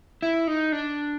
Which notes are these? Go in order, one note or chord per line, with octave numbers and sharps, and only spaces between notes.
E4
D#4
D4